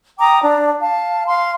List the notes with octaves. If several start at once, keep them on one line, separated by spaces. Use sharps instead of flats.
G5 A#5 D6 D#6
D4 D5
F5 A5
F5 C6